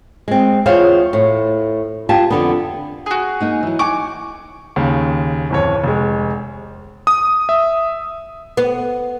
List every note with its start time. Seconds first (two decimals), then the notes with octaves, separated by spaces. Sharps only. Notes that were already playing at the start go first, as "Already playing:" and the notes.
0.28 G#3 C4
0.66 E2 F4 G#4 C5 C#5 F5
1.13 A2
2.09 F4 G4 G#5 A5
2.30 F2 D3 B3
3.06 F#4 G#4
3.41 A#3 D#4 G#5
3.63 E3 F#3
3.79 D#4 G#5 C#6 D6
4.76 D#2 C#3
5.50 D1 F2 C#5
5.84 F1 G#3
7.07 D#6
7.49 E5
8.57 B3